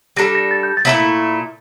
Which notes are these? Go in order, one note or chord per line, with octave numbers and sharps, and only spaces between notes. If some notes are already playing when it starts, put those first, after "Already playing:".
G3 D4 A4 A#6
A#6
A6
G6
A6
A#2 A3 C4 E4